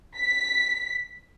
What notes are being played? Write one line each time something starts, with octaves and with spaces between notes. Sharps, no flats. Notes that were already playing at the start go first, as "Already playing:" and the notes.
B6